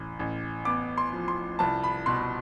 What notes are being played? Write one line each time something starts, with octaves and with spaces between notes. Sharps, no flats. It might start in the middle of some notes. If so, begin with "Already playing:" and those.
Already playing: A1
A1
B3 D6
C6
F3
C6
C2 A5
B5
B2 C6